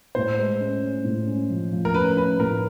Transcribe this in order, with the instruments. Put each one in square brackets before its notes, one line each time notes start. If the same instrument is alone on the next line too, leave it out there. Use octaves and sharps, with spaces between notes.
[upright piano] A2 [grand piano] C5
[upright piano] G#3
C#4
C#4
A2
C#4
F3
F3
[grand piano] A#4
[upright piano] C#4 [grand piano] B4
[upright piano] C#4 [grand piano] B4
[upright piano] A2 [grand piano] A#4